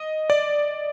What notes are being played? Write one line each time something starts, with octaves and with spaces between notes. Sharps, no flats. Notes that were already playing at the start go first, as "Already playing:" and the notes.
Already playing: D#5
D5